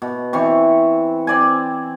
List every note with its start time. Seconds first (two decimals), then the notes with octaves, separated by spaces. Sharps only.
0.02 B2
0.33 E3 C4 C#6
1.27 C4 D5 G#5